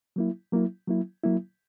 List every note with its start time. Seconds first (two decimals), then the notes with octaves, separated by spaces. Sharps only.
0.16 F#3 A#3 E4
0.52 F#3 A#3 E4
0.88 F#3 A#3 E4
1.23 F#3 A#3 E4